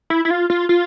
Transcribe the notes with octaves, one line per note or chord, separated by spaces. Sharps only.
E4
E4
F4
F4
F4